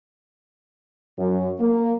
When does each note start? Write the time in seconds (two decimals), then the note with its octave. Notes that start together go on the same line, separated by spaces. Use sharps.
1.19 F#2
1.60 A#3